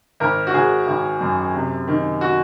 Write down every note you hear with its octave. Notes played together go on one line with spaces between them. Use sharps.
G#1 A#4
F#4
G#1 G#4
G#1
F#2
C3
D#3
F#4